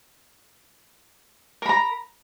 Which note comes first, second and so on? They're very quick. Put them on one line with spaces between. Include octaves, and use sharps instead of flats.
A#4 B5 A#5